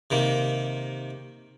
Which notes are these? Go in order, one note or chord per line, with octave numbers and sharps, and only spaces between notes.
C3 D#3 A#3